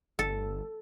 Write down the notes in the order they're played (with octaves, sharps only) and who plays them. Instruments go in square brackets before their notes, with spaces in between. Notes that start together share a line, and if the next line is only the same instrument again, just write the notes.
[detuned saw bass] G1 [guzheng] A4